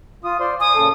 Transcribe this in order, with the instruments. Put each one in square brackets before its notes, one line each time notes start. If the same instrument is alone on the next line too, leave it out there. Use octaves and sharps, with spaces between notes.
[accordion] F4 D#6
C5 D5 C6
[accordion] G#5 [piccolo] D#6
[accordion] A#2 C#3 A4